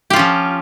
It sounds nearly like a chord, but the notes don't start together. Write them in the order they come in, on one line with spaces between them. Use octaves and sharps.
G4 F4 C#4 F3